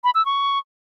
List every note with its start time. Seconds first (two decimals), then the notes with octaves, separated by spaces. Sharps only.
0.04 B5
0.15 E6
0.25 C#6